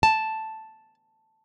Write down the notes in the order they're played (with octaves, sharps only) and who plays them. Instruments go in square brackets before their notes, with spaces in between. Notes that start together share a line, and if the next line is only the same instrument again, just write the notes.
[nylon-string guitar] A5